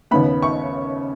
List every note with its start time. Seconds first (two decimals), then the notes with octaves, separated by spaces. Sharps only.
0.11 D#2 C#3 B3 B5
0.42 C#6